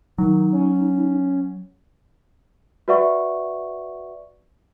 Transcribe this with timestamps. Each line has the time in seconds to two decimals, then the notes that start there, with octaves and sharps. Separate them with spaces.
0.18 D#3 F#3 D#4
0.52 C#4
2.88 F#4 B4 D5 E5 F#5 C#6